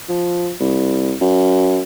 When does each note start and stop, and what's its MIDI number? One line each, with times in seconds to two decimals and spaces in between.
0.09 0.52 53
0.60 1.15 36
1.21 1.81 42